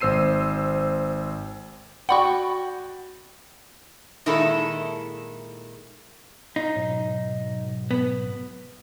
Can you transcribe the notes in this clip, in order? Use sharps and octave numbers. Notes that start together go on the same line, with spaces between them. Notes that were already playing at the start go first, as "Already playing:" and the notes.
G#1 C5 E6 C7 D#7
F#4 D5 F#5 G5 B5 C#6
A#2 D#3 G#3 E4 A4
D#4 F5
G#2 B2 F#3
B3